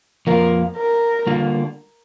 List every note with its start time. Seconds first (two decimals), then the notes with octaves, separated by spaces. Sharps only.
0.27 F2 F3 A#3 F4 A#4
0.77 A#4
1.27 D3 G3 A#3 F4